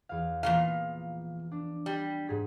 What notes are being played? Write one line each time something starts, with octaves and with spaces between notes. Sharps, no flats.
E2 F5
A#2 E3 F3 A3 B3 F5
D4
G3
G#2 G#4 B6